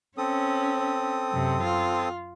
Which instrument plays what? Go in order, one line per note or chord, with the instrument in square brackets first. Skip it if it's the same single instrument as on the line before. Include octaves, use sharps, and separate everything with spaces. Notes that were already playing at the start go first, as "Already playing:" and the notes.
[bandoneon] C4 A4 D#6 [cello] C#4
[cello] F#2 C3
F4